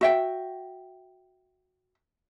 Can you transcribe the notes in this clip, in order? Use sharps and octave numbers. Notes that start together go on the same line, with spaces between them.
F#4 E5 G5